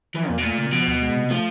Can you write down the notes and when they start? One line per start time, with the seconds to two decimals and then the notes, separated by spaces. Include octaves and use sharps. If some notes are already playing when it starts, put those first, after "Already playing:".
0.14 E3 F3
0.29 E2 A#2
0.38 B2
0.44 A#2 A3
0.58 C#3
0.72 B2 F3
0.87 D2
1.02 G#3
1.17 C3
1.31 F3 A3